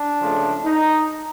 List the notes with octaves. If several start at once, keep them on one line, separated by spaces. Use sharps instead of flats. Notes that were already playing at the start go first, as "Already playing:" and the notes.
Already playing: D4
C#2 C#3 F3 A3
D#4